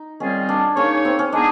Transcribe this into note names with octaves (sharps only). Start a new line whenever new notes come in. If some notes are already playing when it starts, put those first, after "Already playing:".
Already playing: D#4
D#3 G3 C4 C#4 F4 G#4
D4
A#3 C#4 D#4 G#4 C#5
C4
C#4
G#3 B3 D4 D#4 G#4